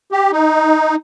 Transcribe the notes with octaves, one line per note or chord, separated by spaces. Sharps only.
G4
D#4